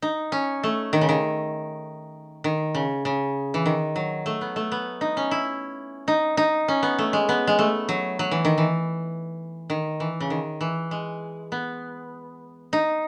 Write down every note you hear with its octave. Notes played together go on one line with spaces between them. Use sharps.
D#4
C#4
A3
D#3
C#3
D#3
D#3
C#3
C#3
E3
D#3
F#3
A3
B3
A3
B3
D#4
C#4
E4
D#4
D#4
C#4
B3
A3
G#3
B3
G#3
A3
F#3
F#3
E3
D#3
E3
D#3
E3
C#3
D#3
E3
G#3
B3
D#4